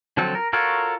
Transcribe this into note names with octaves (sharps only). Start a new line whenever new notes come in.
D3 F3 F#3 C4 A4
A#4
F4 F#4 A4 A#4 C#5